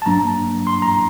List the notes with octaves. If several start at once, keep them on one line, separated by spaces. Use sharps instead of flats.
A5
G2 F#3 A#3 D4 A#5
C6
A#5